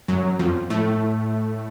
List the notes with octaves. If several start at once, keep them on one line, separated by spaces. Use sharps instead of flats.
F#2 F#3
F2 F3
A2 A3